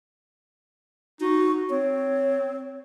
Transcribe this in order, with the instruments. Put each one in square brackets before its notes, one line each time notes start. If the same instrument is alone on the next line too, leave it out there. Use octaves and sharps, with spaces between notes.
[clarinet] D#4 [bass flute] F#4
[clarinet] C4 [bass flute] C#5